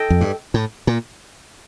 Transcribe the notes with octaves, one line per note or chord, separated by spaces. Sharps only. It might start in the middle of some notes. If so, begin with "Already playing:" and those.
Already playing: A4 D#5 G5
F2
G2
A2
A#2